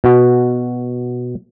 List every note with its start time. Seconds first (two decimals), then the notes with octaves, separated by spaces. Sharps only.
0.04 B2 F#4